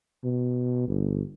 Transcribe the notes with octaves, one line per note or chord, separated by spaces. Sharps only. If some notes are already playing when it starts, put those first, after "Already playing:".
B2
G1